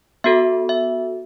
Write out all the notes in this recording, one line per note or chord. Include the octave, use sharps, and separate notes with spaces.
B3 F#4 A4 E5
E5